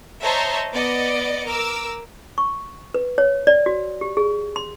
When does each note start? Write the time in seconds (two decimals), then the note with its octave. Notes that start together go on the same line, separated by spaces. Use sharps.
0.23 C5 C#5 D#5 E5 A5 A#5
0.72 B3 D5 D#5 D6 C#7
1.46 A#4 D6 E6
2.38 C#6
2.94 B4
3.18 C#5
3.47 D5
3.66 F#4
4.01 G4
4.17 G#4
4.56 C6